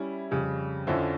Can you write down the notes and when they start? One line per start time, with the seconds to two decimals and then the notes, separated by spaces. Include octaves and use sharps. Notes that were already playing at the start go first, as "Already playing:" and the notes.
Already playing: G3 C#4 E4
0.31 F2 C#3 G3
0.87 F2 D3 F3 C#4 E4